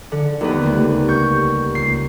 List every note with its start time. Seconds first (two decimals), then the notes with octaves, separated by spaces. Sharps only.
0.12 D3
0.41 D#2 G3 B3
0.64 C#2 A3
1.08 C#6 G6
1.75 C#2 C7